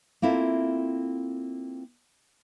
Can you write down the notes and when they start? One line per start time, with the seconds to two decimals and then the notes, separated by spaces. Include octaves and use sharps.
0.22 A#3 C4 E4 F4 A4